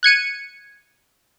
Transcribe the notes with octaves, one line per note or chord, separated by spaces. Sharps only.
F#6 G#6 C#7 D#7